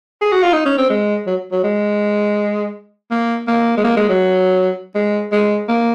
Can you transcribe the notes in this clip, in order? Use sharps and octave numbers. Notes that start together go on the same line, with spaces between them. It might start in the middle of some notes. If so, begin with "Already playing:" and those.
G#4
F#4
F4
D#4
C#4
C4
G#3
F#3
F#3
G#3
A#3
A#3
G#3
A#3
G#3
F#3
G#3
G#3
A#3